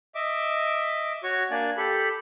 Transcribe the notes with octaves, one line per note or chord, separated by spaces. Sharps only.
D#5 E5 D6
F#4 C#5 C#6
A#3 D4 D5 G#5
G4 A4 B5